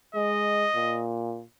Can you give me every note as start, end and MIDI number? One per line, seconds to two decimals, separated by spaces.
0.15 0.67 56
0.15 1.02 75
0.75 1.44 46